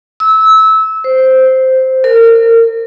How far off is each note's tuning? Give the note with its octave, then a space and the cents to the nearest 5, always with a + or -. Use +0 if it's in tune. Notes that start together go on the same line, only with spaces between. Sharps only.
E6 -20
C5 -5
A#4 -30